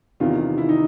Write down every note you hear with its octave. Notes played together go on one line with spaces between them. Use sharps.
E2 C3 D#3 F4
E4
D#4